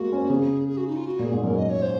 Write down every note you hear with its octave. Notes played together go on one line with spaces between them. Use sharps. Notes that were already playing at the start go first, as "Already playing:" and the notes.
Already playing: G#3 A#3 F#4
C#4
C4
C#3 G#4
G#4
F#4
D#4
F4
F#4
A#2
G#4
G#2
F#2 A#4
D#5
C#5
C5